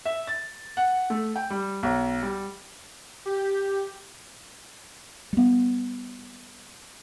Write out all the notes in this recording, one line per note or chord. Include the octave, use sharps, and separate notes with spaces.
E5
A6
F#5
A3
G5
G3
B1
G3
G4
G3 B3